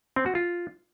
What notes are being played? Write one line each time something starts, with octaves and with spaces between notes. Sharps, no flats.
C4
F#4
F4